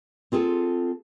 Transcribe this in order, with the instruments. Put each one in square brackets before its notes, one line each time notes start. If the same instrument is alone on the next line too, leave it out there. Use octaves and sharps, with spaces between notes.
[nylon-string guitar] C4 F4 G#4 A4